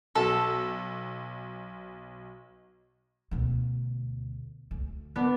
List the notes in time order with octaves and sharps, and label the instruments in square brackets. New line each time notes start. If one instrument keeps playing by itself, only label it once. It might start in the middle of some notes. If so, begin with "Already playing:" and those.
[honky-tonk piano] B1 [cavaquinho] A4
[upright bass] D2 B2
D2
[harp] B3 D4